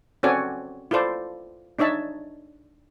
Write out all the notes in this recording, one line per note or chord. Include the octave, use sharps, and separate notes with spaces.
C4 C#4 F#4 A4 D5 G#5
E4 F4 A4 C5 D5
D4 D#4 C#5 E5 A5